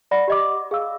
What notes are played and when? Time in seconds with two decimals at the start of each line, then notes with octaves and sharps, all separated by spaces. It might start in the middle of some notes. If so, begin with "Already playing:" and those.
0.11 D5 F#5 B5 A#6
0.28 G4 D#5 D6
0.71 G#4 F5 E6